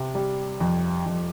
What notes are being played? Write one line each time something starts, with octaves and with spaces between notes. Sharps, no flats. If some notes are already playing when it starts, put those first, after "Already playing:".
Already playing: C3
G3
F2
F2